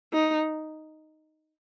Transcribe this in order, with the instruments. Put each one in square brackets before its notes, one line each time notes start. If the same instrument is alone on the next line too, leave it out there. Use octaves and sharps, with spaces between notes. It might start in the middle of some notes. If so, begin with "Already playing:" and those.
[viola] D#4